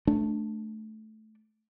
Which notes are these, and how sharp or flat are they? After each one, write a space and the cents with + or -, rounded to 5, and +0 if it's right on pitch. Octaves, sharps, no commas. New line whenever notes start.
A3 -15 D4 +5